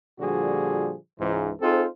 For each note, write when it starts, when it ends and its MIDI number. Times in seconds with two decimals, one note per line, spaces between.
0.20 0.94 46
0.20 0.94 50
0.20 0.94 53
0.20 0.94 55
0.20 0.94 66
0.20 0.94 68
1.19 1.51 37
1.19 1.51 44
1.19 1.51 52
1.61 1.86 60
1.61 1.86 63
1.61 1.86 65
1.61 1.86 68
1.61 1.86 69
1.61 1.86 72